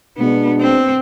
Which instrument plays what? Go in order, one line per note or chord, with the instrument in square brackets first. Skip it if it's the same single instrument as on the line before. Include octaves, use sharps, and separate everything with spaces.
[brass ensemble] B2 G#3 D4 [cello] B3
[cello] C4